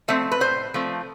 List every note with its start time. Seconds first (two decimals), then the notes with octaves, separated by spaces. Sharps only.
0.08 F3 A3 C4 E5
0.31 B4
0.40 A2 C5
0.74 F3 A3 C4